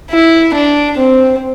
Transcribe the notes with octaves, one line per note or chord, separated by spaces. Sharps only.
E4
D4
C4